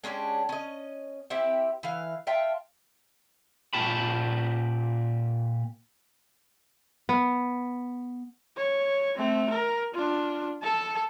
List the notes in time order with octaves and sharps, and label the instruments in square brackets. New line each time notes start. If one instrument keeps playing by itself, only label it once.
[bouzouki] G#3 C#4 D4 G4
C#4 D#5
C4 E4 G4 E5
E3 F5
F4 E5 G5 A5
[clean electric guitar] A#2 G4 A5 B5
[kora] B3
[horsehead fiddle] C#5
A3 C4
A#4
D4 F4
A4 A5